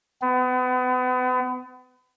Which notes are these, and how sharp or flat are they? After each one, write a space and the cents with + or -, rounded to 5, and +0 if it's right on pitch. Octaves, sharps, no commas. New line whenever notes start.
B3 +35